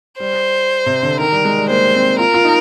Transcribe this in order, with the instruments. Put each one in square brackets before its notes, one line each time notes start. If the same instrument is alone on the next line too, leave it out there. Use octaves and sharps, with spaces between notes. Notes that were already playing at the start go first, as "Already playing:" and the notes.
[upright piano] G3 [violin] C5
[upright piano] C3
D3
[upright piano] D#3 [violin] A#4
[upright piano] G3
G#3
G3
[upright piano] A#3 [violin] C5
[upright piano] C4
[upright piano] F4 [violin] A#4
[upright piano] F4
D#4